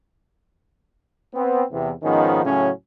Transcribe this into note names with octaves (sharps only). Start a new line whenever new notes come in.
B3 C4
E2 C3
G#2 D#3 F3 B3 C#4 D#4
A2 C#3 F#3 C#4